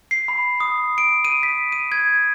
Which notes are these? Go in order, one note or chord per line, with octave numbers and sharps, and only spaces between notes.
C7
B5
D#6
D7
D#7
B6
D#7
G#6